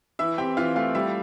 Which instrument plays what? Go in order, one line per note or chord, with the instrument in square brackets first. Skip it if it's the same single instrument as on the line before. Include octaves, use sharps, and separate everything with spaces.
[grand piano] E3 [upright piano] E4 E5
[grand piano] C4 [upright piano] G4 G5
[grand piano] E3 [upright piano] F4 F5
[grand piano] A3 [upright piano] F4 F5
[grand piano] G3 [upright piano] E4 E5